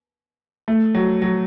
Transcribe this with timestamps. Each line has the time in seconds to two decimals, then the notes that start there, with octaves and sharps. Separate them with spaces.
0.68 A3
0.95 F#3
1.22 F#3